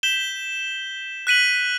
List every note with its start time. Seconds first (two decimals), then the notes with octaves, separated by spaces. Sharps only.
0.03 G6 B6 E7 G7
1.27 F#6 B6 D#7 F#7